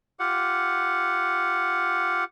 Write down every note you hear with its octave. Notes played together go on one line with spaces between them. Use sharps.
F4 G4 F#5